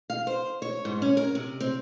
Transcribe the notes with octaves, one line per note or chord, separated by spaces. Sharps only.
F5
C5
C#5
G#2
C#4
A#4
C3
C4